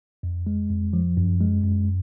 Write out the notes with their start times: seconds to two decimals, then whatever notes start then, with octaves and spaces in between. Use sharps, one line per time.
0.23 F2
0.47 G#3
0.70 F2
0.93 F3
1.17 F#2
1.41 G#3
1.64 F#2